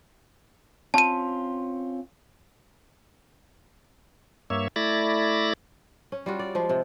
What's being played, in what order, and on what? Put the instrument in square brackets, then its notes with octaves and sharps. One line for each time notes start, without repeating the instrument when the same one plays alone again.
[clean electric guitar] C4 C#4 F4 [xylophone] A5 D#7
[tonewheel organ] G2 A#3 C#5 E5
A3 E4 D5 B5 A6 A#6
[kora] C#4
G3 F4 F#4
D5
F3 G#3
C3